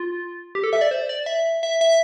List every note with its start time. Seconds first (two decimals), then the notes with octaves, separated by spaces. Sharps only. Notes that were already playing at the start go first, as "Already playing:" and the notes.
Already playing: F4
0.55 G4
0.64 A4
0.73 E5
0.81 D5
0.91 C5
1.09 D5
1.26 E5
1.63 E5
1.81 E5